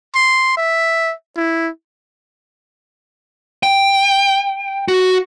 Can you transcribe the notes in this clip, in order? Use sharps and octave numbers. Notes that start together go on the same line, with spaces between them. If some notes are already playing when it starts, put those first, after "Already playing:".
C6
E5
E4
G5
F#4